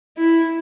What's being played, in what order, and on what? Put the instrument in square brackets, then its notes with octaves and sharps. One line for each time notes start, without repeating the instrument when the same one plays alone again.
[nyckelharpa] E4